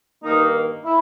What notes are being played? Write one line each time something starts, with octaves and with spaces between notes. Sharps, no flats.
G2 D#3 A#3 D#4
E4